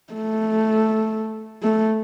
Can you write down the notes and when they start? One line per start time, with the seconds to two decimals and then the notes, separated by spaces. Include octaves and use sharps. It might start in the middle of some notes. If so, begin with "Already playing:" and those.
0.13 A3
1.63 A3